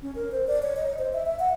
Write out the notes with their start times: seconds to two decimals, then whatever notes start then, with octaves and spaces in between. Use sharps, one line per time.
0.02 C#4
0.15 A#4
0.32 C5
0.47 D5
0.63 C#5
0.76 D#5
0.98 C5
1.13 E5
1.26 E5
1.39 F#5